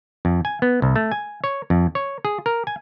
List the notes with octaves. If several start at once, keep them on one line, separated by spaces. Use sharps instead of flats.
F2
G#5
B3
C2
A3
G#5
C#5
F2
C#5
G#4
A#4
G#5